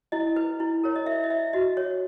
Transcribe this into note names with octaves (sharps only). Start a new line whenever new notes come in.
E4 D#5
B4
E4
A#4 C#5
D#5
E4 E5
D#5
B4 E5
F#4 D#5
C#5